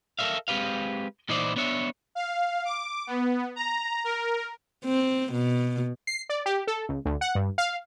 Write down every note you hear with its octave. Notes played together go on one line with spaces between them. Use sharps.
A4 A#4 C5 E5 F5
G#3 C4 G4 B4 F5
A#2 E3 D#4 E4 C5 D5
B3 D4 C#5 E5
F5
D6
B3
A#5
A#4
C4
B2
C7
D5
G4
A4
C#2
D2
F#5
G2
F5